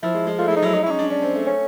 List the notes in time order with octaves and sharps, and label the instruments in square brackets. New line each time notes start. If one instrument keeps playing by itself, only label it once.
[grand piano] F3 [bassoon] E4
[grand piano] G#3
G#3
[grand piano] A3 [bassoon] F4
[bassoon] E4
[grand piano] G#3
[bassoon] D#4
[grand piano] F#3 [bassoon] E4
[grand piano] G#3 [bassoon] D#4
[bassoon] E4
[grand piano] C#4
[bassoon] D#4
[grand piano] D4
[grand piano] C#4 [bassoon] D4
[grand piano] C4
A3
[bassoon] C#4